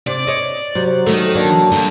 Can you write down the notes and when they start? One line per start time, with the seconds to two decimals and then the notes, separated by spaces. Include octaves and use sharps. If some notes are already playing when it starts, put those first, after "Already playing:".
0.07 C3 D5
0.27 C#5 D#5
0.75 C3 F#3
1.07 D#3 A3 D#4
1.35 D3 A#3 D4
1.71 G2